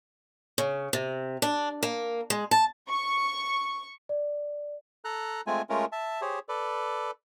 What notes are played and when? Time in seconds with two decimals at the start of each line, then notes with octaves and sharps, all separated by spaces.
0.58 C#3
0.93 C3
1.42 D4
1.83 A#3
2.30 G#3
2.51 A5
2.89 C#6
4.09 D5
5.05 A4 A#5 F#6
5.47 G#3 A3 C4 F4 G#5
5.70 G#3 A3 C#4 F4 A#4
5.92 E5 A5
6.22 G4 G#4 C5 C#5
6.49 A4 B4 D5